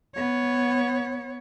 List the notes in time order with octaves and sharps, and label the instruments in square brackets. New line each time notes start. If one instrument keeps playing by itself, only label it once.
[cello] B3 C#5